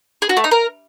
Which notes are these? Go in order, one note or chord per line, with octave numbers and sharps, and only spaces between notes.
G#4
F#4
A3
D#4
A#4